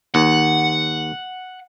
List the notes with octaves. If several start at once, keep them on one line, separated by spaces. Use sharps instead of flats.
D#2 F#5